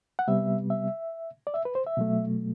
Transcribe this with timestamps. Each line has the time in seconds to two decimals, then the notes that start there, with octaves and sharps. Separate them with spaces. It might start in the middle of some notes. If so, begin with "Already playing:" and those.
0.19 F#5
0.27 C3 G3 B3 E5
0.70 E5
1.47 D5
1.54 E5
1.65 B4
1.75 C5
1.86 E5
1.97 B2 F#3 A3